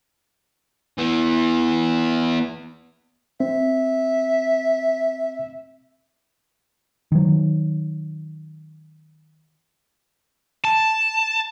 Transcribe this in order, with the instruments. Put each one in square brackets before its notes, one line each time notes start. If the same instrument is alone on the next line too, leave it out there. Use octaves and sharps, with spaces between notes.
[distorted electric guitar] E3 B3
[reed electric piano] C4 [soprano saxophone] E5
[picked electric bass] D#3 F#3
[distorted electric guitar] A5